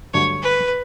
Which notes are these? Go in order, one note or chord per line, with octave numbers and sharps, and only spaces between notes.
G2 D3 F#3 A3 C#5
B4